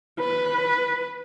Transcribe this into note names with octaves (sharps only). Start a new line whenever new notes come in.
B4